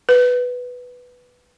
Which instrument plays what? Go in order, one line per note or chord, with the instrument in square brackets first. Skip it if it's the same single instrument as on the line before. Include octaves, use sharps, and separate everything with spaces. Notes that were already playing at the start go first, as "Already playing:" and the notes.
[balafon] B4